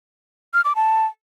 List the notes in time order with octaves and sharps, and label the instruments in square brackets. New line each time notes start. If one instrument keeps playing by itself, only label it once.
[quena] F6
D6
A5